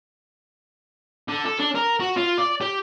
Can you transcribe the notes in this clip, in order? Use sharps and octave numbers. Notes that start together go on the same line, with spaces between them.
D3
A4
D4
A#4
F#4
F4
D5
G4